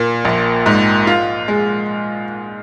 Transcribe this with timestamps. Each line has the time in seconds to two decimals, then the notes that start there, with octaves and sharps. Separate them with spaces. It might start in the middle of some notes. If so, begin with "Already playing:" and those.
Already playing: A#2
0.25 A#1
0.66 G#2
1.07 F4
1.48 G#3